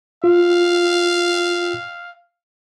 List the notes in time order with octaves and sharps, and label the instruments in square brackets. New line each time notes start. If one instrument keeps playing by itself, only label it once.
[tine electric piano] F4 [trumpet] F5